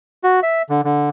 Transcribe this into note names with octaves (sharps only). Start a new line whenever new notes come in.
F#4
E5
D3
D3